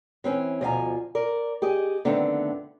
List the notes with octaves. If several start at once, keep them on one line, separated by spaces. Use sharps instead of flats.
E3 C4 C#4
D2 B2 F3 F4 G#5 A#5
A#4 D5
G4 G#4 D#5
F2 D3 D#3 A3 B3 C4